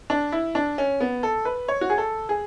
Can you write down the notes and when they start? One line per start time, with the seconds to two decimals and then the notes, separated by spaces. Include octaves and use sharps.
0.10 D4
0.32 E4
0.55 D4
0.78 C#4
1.00 B3
1.23 A4
1.45 B4
1.68 C#5
1.81 F#4
1.90 G#4
1.98 A4
2.29 G#4